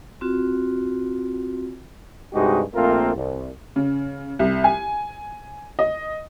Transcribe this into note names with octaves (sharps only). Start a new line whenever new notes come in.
C4 F4 F#4
G2 C3 G#3 D#4 F#4 G4
A#1 A3 A#3 C4 F4 A#4
C2
C#3
C2
G#5
D#5